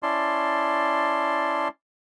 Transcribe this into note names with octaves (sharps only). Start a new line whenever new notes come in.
C#4 E4 D5 A5 C6